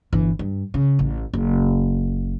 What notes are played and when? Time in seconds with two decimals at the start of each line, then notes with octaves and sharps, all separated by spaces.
0.13 G1 E3
0.39 G2
0.74 C#3
0.99 A1
1.33 F#1